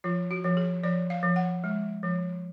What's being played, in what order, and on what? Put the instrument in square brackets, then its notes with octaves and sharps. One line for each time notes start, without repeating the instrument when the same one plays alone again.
[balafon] F3 F4
F#4
F3
G#4
F3 D5
F5
F3
F#5
G#3
F3